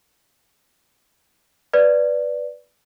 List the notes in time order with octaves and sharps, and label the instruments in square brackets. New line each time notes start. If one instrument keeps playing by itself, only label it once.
[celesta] B4 D5